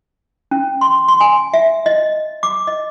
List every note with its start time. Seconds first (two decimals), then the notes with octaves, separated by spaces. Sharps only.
0.51 C#4
0.81 C6
1.08 C6
1.21 G#5
1.54 E5
1.86 D#5
2.43 D6
2.67 D#5